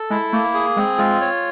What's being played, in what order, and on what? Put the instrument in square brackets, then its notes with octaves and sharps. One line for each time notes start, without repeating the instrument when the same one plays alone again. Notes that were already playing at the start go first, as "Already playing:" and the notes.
Already playing: [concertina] A4
[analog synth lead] G#3 [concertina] E4
[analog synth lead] A3 [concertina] A#3
[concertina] G#4
[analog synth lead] G#3 [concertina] C4
[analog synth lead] G#3 [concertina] F4
[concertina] C#5